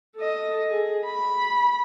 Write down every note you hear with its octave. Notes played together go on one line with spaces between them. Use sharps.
A4 D#5
G#4
B5